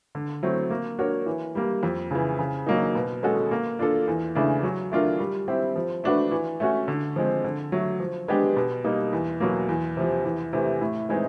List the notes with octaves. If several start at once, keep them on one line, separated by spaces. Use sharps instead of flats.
D3
F#3 A3 C4 E4
A#3
D4 F#4 A#4 C#5
E3
G3 A#3
F2
C#3 E3
C#3
F#3 A#3 D#4
B2
G#3 C#4 F#4 A4
A#3
D4 F4 A4
E2
C#3 E3 A3 D4
F#3
A3 D4 F4 A#4
G3
C4 E4 G4
F3
A3 D4 F#4 B4
E3
A3 C#4 F#4
D3
F3 G#3 C4
D3
F#3 A3
F3
G#3 B3 D4 G4
B2
G3 A#3 D#4
E2
B2 F#3 A#3
E2
C3 F3
E2
C3 E3 A3
A2
E3 G#3 C4 D#4